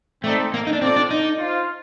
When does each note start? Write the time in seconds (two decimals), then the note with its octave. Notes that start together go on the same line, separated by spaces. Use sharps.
0.24 A3 C4 D#4 A4 D5
0.54 A#3
0.67 D#4
0.73 D4
0.81 C4 F4 A4 D5
0.96 D4
1.11 D#4
1.39 F4 C5 F5